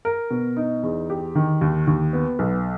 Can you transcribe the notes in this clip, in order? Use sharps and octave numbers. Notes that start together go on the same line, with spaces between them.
A#4
B2
D#4
E2
G4
D#3
D#2
D#2
B3
B1